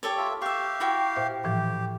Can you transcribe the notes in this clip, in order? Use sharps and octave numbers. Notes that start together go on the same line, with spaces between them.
G4 A4 C#5
F4 E5
G4 E5 F5 C#6
E4 F#4 G5
A#2 C5 E5
A2 E3 F3 G4